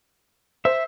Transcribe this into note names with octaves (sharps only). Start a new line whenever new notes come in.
C5 E5